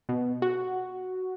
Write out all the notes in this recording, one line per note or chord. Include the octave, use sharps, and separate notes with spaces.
B2
F#4